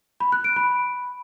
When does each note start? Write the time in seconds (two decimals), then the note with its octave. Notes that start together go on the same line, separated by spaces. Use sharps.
0.20 B5
0.32 F#6
0.44 D7
0.56 B5